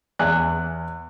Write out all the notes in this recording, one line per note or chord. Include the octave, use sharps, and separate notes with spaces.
E2 G#5 F#6